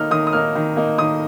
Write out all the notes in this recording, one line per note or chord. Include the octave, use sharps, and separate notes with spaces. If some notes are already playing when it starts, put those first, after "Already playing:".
Already playing: D#3 A#3 D#4 F6
D#3 D#6
D#6
A#3 D#4 F6
D#3
A#3 D#4
D#3 D#6